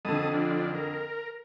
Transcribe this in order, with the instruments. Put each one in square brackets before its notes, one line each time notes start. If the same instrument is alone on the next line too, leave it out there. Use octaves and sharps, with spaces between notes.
[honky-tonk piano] F2 D3 [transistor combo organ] A5 D#6
[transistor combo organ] F3 D4
A#4